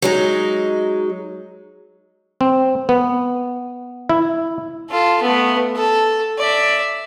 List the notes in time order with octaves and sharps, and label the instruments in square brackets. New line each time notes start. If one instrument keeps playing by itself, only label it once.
[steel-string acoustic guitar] F#3 G#3 D#4
[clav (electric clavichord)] C4
B3
E4
[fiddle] F4 A4
A3 B3
A4
D5 E5